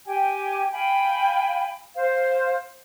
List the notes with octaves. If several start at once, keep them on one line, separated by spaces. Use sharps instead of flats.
G4 G5 G#5
F5 G5 G#5 B5
C5 F5